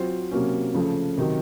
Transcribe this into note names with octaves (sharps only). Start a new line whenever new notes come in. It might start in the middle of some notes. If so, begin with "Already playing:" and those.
Already playing: F#3 C4 F4 C5
C3 F#3 A#3 C#4
C#3 F3 A3
C3 D#3 F#3